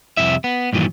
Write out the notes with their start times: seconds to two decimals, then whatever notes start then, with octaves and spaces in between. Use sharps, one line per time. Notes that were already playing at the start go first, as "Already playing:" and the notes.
0.17 C2 F2 C3 E4 E5
0.44 B3
0.73 G2 A#2 D#3 E3 F#3